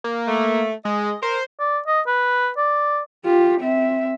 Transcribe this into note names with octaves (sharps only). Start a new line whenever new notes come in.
A#3
A3
G#3 D#5
A#4 C5
D5
D#5
B4
D5
F4 G4
C4 E5